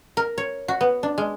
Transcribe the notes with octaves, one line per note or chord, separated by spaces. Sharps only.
A#4
C#5
F#4
B3
D4
G#3